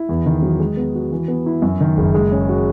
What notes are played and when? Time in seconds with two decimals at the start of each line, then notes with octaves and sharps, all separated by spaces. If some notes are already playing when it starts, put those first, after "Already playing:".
Already playing: E4
0.09 E2
0.26 D#3
0.42 F#3
0.60 G#3
0.77 B3
0.95 F#4
1.12 E3
1.28 B3
1.46 E4
1.62 F#2
1.80 D#3
1.97 F#1
2.14 G#3
2.32 C#4
2.49 F#4